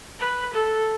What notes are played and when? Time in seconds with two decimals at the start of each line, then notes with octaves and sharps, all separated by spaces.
0.20 B4
0.54 A4